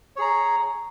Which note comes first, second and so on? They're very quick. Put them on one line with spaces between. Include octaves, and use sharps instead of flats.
C#5 G#4 A#5